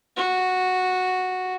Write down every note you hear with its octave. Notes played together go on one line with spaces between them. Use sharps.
F#4